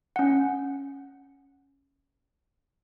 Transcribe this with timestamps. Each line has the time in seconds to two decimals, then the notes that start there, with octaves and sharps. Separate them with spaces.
0.16 C#4 F#5